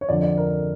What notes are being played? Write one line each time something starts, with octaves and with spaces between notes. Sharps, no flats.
C#5
F2 D3 D5
D5
A#4